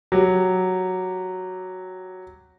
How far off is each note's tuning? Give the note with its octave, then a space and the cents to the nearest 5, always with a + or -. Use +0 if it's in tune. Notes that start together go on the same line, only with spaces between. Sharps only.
F#3 +0 G4 +0